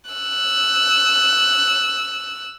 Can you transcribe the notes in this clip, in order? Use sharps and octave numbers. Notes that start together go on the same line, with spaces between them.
E6 F#6